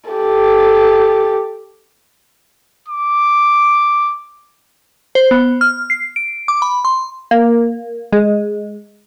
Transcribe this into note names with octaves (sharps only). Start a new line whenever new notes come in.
G4 A4
D6
C5
B3
F6
C7
D7
D6
B5
C6
A#3
G#3